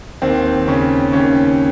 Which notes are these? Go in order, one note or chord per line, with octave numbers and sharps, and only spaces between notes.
D#2 C4
C#3 C#4
D#2 C#4